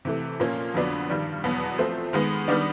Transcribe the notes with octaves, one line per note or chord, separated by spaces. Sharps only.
C3 E3 A3
A#2 F3 A#3 C#4
F2 D3 F#3 B3 D4
G2 D#3 G3
E2 B2 F#3 B3
F3 A3 C4 F4
D#3 G#3 B3
D#3 G3 B3 D4